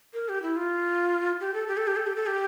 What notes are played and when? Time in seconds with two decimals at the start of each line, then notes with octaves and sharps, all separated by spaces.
0.14 A#4
0.29 G4
0.42 E4
0.57 F4
1.41 G4
1.54 A4
1.68 G4
1.77 A4
1.87 G4
1.96 A4
2.07 G4
2.16 A4
2.26 G4